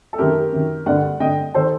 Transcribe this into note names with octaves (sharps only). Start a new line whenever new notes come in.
A4
F#2 D#3 G4 A#4
F#2 D#3
G2 D3 D5 F#5
G2 D3 D#5 G5
D#3 A4 C5